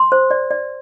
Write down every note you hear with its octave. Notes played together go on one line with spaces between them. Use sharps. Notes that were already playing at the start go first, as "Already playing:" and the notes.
Already playing: C6
C5
D5
D5